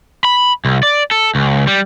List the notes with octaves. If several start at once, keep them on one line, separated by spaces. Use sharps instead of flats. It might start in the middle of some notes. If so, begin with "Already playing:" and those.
B5
C2
D5
A4
C#2
G3